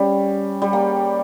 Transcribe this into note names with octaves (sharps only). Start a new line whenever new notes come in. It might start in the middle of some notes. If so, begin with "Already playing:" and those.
Already playing: G3 C#4
G3
A#3